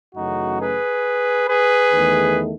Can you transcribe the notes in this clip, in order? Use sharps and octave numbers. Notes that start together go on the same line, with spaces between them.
F#2 C#3 E3 A3 D#4 F#4
G#4 B4
G#4 B4
E2 D#3 A3